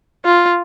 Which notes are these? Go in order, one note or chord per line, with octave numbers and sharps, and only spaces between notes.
F4